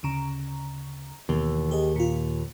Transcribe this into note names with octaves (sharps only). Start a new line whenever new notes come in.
D2 C#3 A#5
D#2 B2 E3
G4 G#4 D#5
A#2 F4